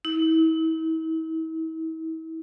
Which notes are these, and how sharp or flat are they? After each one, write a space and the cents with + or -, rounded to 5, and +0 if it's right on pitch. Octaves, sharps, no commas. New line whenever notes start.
E4 -40